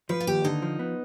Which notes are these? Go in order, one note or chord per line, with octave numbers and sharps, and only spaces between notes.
F3 B4
F4
D#2 G4
D3 D#4
F3
B3